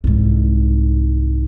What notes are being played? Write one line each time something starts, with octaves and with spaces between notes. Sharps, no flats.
C2 G#2